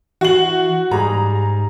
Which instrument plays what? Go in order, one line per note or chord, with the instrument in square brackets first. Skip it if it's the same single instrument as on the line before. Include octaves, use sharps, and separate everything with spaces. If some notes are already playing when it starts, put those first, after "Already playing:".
[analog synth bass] E3 [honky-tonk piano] F#4 F#7
[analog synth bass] G#2 [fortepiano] G3 G#4 [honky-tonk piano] A#5